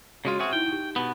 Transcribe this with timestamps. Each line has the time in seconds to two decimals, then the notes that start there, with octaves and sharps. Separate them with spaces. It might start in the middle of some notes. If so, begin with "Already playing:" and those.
0.25 C#3 G#3 F4 F#4 C#5 G#6
0.39 C4 F#4 G#4 E5 F6
0.53 D#4 E4 G5
0.68 D#4 G4
0.96 B2 B3